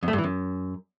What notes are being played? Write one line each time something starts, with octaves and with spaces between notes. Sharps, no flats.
F2
A3
G2
E3
F#2